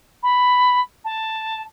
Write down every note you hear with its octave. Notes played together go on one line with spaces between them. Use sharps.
B5
A5